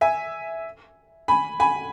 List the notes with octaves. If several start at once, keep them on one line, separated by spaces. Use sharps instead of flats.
E5 G#5
G#5 B5
G#5 B5